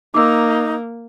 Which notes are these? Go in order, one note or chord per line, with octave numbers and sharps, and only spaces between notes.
A#3 D#4 D6 E6